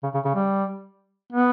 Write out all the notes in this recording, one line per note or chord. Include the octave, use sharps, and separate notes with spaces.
C#3
C#3
C#3
G3
B3